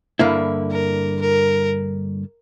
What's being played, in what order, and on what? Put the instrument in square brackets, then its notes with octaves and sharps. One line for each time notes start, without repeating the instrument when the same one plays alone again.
[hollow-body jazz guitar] G2 D3 A#3 E4
[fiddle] A#4
A#4